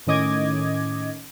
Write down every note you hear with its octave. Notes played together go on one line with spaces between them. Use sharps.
A2 D#3 C#4 D#5 D6 G#6